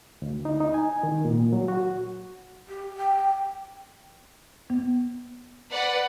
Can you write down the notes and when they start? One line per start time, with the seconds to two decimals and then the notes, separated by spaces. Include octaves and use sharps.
0.22 D2
0.45 D#4
0.60 D#4
0.74 G#5
1.03 D#3
1.25 A#2
1.53 F#3
1.68 F#4
2.68 G4
2.97 G5
4.70 B3
5.71 B4 D5 F#5